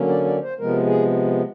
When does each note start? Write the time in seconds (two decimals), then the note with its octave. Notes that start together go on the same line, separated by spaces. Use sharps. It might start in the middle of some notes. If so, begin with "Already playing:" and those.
Already playing: D3 F#3 A#3 C#4
0.08 D5
0.25 D5
0.42 C5
0.59 C3 F3 G#3 B3 A#4
0.86 G#4